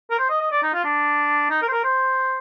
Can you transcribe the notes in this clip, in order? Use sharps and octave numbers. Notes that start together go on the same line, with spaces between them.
A#4
C5
D#5
D#5
D5
D#4
F4
D4
D#4
A#4
C5
A#4
C5